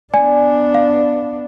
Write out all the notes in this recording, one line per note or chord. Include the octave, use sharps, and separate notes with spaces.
B3 D4 D5 G#5
F5